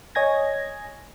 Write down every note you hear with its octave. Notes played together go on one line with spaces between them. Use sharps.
C#5 D#5 G#5 G#6 A#6